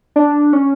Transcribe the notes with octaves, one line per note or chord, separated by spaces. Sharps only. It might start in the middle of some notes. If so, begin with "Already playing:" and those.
D4
C#4